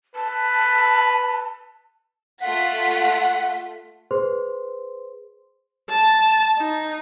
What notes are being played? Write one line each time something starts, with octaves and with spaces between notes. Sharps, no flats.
B4 A5
A3 F4 F#5 B6
G#4 B4 C5 C6
A5
D#4